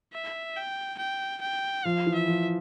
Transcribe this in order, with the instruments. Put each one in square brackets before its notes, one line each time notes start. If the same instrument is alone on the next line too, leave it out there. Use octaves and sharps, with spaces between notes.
[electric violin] E5
G5
G5
G5
[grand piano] F3 [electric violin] F5
[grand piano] E3
[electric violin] E5
[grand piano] F3